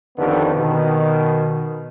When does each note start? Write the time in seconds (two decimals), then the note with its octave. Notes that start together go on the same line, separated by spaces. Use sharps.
0.17 F2 D3 D#3 B3 G4 B4
0.56 B2 D#3